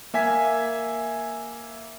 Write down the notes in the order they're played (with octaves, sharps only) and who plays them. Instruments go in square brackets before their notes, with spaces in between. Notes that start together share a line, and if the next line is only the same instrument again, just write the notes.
[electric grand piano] A#3 E5 G#5 B6